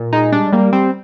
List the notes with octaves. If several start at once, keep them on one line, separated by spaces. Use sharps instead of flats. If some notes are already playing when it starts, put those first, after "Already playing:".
Already playing: A#2
G#3 D#4
G3 D4
G3 A#3
G3 C4